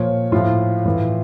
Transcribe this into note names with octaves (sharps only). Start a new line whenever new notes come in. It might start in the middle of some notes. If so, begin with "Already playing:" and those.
Already playing: A#2 F3 C#5
A2 F3 F4
A2 E3